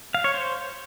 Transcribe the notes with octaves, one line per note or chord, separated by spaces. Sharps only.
F5
C#5
C5